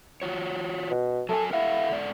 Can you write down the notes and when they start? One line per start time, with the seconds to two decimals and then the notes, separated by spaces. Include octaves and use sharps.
0.22 F4 F#4 C#5
0.91 B2
1.29 F#3 A4 A#4 G#5
1.53 E4 A4 F5 F#5
1.92 G#2 A4 D5